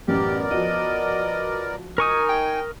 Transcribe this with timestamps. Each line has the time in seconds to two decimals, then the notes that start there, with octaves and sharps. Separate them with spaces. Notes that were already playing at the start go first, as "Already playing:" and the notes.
0.08 A1 F#2 B3 G4 A#4 D5
0.51 F3 F#4 D#5
1.98 D#4 A#4 G#5 C#6 D#6
2.29 G5